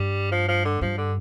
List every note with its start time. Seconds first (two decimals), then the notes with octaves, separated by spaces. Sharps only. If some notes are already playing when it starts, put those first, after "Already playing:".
Already playing: G2 G3
0.32 F3
0.49 F3
0.65 D3
0.81 G2 F3
0.98 D3